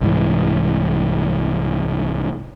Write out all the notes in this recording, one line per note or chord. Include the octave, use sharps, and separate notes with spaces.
C2 G#2 E3